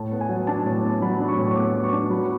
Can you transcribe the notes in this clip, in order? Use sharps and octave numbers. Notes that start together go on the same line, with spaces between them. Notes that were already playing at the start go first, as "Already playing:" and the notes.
Already playing: A2 A5
B3
G#5
F#3
D4 A5
A2
B3
F#3 B5
D4
C#6
A2
C#6
B3 D6
F#3
C#6
D4
F#3 B5